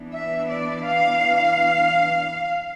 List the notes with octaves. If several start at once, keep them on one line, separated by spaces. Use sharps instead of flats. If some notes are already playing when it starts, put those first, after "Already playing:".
Already playing: E3 B3 D4
E5
D5
F5